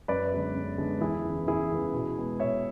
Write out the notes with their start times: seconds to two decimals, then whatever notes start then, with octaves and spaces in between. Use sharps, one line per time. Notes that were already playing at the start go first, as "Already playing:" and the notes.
0.08 F#2 B4 D5
0.32 D3 G#3 B3
0.55 F#2
0.78 D3 G#3 B3
1.01 E2 E4 G#4
1.24 C#3 E3 B3
1.48 E2 E4 G#4
1.70 C#3 E3 B3
1.94 B2
2.17 G#3 B3
2.40 B2 C#5 E5